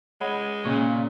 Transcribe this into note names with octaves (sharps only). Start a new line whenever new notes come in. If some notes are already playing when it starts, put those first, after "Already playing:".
G#3 C#5 F#5 B5
A#2 C#3 C#6